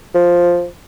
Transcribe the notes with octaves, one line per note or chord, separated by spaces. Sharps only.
F3